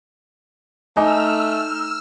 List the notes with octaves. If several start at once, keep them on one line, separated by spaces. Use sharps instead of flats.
A3 D#4 G#5 D6 E6 F6